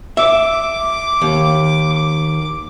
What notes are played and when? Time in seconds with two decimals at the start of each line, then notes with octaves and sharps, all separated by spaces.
0.17 E5 D6
1.21 D#2